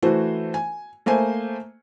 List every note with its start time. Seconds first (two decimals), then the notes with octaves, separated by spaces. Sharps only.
0.02 E3 A3 F#4 C5
0.54 G#5
1.06 A3 A#3 C5 G#5